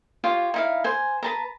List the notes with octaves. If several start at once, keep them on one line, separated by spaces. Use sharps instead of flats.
F4 G4 C#5
D#4 E4 F5
C5 G#5
B4 A5 A#5